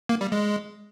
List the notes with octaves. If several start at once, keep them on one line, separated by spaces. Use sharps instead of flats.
A#3
G3
G#3